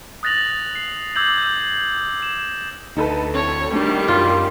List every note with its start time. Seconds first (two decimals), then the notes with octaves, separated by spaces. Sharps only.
0.23 D#6 F#6 A6 A#6 F7 F#7
0.75 C7
1.16 D6 E6 G6 G#6 F#7
1.38 G6
2.23 E7
2.97 D2 D#4 A4 B4
3.34 C4 E4 A4 C#5
3.73 D#3 G3 A3 D4
4.08 F#2 F4